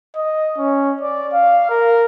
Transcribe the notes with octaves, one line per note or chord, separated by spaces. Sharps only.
D#5
C#4
D5
F5
A#4